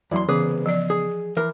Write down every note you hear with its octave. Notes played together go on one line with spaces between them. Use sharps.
E2 F#3 E4 D5 C6
C2 C#3 E3 B3 G#4 B4
F3 D5
G#4
E3 A#4